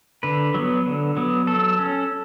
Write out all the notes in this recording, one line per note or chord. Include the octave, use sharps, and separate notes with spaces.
D3 B4
F#3 B3
D3
F#3 B3
F#3 A4
C#4